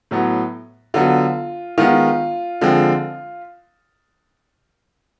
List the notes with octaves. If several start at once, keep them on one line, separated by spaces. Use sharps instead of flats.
A2 F#3 B3
D3 F#3 B3 F4
D#3 G#3 B3 F4
D3 F3 G#3 C4